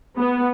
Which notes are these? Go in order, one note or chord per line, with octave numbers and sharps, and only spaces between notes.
B3